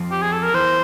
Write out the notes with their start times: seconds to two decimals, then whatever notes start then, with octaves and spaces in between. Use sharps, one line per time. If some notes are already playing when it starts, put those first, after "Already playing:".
Already playing: F2 F3
0.12 G4
0.22 G#4
0.33 A4
0.43 A#4
0.54 E2 E3 C5